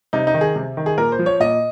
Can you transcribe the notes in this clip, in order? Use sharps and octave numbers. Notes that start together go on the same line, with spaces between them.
C3 D#4
D#4
D#3
G#4
C3
D#3
G#4
A#2 A#4
C5
F3
C#5
A#2 D#5